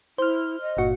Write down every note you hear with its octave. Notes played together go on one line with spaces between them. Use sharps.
E4 C5 F6
D#5
G1 A#2 F#4